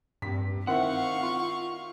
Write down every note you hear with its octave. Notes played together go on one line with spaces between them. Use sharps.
G2 C3 B6
D#3 C4 E4 F5 F#5 C#6
F4